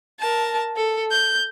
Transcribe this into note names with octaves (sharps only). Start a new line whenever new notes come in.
A#4 A5
A4
G6